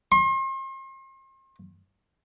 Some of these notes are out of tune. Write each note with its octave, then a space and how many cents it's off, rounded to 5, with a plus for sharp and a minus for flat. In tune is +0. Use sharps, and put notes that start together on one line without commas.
C6 +40